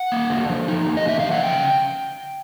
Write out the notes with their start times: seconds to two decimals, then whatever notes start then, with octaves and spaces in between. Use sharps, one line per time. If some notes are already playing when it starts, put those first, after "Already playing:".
Already playing: F#5
0.12 A#3
0.30 D3
0.49 F3
0.68 D#4
0.87 A#3
0.97 D#5
1.06 D3 E5
1.20 F3 F5
1.32 F#5
1.43 C#3 G5